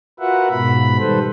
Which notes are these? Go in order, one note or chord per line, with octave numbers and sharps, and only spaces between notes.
F4 F#4 A#4 B4 E5 F#5
G#2 B2 B5
D#3 G3 A4 B4 C5